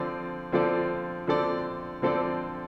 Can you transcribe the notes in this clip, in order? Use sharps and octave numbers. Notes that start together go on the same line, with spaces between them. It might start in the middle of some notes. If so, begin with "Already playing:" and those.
Already playing: D3 F3 C4 A4 D5
D3 F3 C4 A4 D5
D3 F3 C4 A4 D5
D3 F3 C4 A4 D5